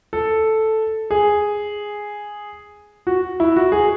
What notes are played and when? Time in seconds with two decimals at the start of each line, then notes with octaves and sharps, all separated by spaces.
0.13 A4
1.11 G#4
3.07 F#4
3.40 E4
3.56 F#4
3.72 G#4